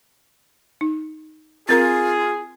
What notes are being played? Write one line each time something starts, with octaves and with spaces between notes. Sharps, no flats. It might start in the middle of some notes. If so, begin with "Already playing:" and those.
D#4
C4 F4 G#4 A#4 A#5 A6